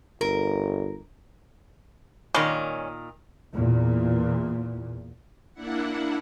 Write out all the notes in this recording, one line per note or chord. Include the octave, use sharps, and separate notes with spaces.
G1 A#4
A#2 D#3 G3 G#3 C#4
E2 A#2
A#3 D4 E4 F#5